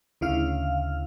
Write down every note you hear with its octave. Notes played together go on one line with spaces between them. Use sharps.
D2 C#3 E4 F5 F6